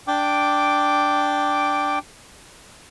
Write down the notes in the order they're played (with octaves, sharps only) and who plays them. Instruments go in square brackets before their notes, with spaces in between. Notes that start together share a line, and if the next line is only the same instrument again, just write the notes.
[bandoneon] D4 G5 D6